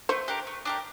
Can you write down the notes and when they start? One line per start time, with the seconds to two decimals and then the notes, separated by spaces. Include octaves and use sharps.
0.09 A3 C5
0.28 D4 G4 A#4
0.47 A3
0.65 D4 G4 A#4